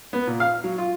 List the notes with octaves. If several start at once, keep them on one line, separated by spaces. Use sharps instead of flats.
B3
A#2
F5
F#3
F4